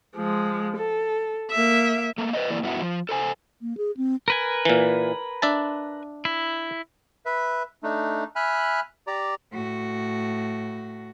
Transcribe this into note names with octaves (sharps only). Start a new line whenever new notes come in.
F3 G#3
A4
A#3 E5
A3 A#3
B4 C5 D#5 E5
E3 A#3 E4 D5
G2 B3 E4 F#4
F3
A4 C5 G#5
A#3
G#4
C4
A#4 B4 G#5
A#2 E3
D4 E5 A5
E4
B4 E5
A3 D4 D#4
E5 G#5 B5 F6 F#6
G4 D5 A#5
A2 F#4